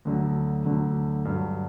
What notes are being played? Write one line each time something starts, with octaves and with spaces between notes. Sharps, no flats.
D2 D3 F#3
D2 D3 F#3
G2 D3 F#3